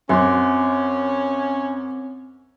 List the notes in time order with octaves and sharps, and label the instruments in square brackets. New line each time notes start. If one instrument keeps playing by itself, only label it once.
[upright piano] F#2 G#5 C6 [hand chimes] C4 D6 [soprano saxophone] C#4